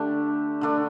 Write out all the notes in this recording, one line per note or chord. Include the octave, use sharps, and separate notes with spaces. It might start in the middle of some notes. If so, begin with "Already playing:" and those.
Already playing: D3 A3 D4 G4
D3 A3 D4